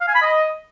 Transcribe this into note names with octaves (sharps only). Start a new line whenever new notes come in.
F5
G#5
B5
D#5